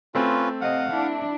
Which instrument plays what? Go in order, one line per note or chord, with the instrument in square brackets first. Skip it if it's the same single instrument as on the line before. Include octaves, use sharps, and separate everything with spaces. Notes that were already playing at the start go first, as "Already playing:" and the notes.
[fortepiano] A3 C4 [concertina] C#4 F4 B4
[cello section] C3 D#5 [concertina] F5 F#5
[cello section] D4 E4